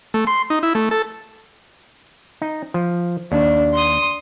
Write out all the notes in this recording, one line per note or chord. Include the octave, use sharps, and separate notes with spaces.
A3
C6
D#4
E4
A3
A4
D#4
F3
D#2 D4
C6 D#6